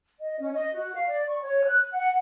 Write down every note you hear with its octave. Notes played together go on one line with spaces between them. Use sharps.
D#5
C#4
D#5
F#4
F5
D5
C#6
C#5
F#6
F#5